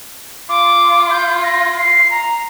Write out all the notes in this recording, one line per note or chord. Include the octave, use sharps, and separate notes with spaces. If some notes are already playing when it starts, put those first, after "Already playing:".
F4 D6
G6
A#6
C7
A#5